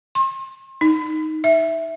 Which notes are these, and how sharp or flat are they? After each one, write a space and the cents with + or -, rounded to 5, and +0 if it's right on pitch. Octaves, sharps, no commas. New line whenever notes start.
C6 +40
D#4 +5
E5 +0